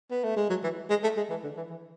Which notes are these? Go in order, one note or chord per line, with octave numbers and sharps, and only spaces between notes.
B3
A3
G#3
F#3
E3
G#3
A3
G#3
E3
D3
E3
E3